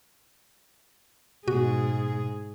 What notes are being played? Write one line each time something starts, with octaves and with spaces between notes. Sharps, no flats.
G#2 B2 F#4 G#4